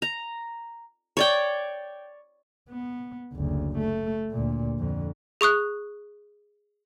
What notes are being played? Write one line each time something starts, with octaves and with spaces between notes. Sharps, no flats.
A#5
C#5 D5 G5
B3
F#1 D2
A3
D2 A#2
F2 D3
G#4 C#6 D#6 F#6